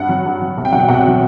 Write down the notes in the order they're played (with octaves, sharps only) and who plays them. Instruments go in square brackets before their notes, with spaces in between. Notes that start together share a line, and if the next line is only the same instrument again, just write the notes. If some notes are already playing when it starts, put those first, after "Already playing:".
Already playing: [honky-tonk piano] G2 F#5
F#3
G2
F#3
C2
G5
B2 F#3 F#5
G5
C2 F#5
B2 F#3